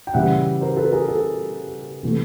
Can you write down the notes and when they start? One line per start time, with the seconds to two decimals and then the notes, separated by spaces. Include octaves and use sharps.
0.07 G5
0.14 C#3 E3 G3 E5 F#5
0.61 A#4 C5
0.77 A4 B4
0.92 G#4 A#4
1.08 A4
2.03 C3 E3 A3